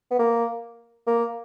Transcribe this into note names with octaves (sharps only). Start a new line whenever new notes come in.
B3
A#3
A#3